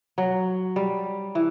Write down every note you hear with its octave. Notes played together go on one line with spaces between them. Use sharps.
F#3
G3
E3